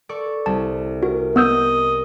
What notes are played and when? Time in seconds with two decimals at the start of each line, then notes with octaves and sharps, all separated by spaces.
0.09 A4 D5 C#6
0.46 C2 A5
1.03 F#4 A#4
1.36 B3 D#5 E6 G6